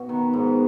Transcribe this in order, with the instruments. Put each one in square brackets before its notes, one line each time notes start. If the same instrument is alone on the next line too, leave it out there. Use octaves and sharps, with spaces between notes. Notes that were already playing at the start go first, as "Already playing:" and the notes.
Already playing: [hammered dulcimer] B2 F#4
[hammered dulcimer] D#3 [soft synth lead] B3
[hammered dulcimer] G#2